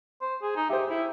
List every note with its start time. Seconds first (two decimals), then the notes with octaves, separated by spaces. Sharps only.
0.21 C5
0.42 G#4
0.56 D#4
0.70 G4 C5 E5
0.90 E4